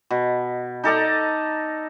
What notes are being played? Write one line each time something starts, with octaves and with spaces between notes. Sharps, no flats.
B2
D#4 A4 D5 A#5